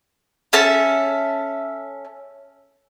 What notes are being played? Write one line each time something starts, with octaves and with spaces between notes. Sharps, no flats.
C#4 A4 E5 A5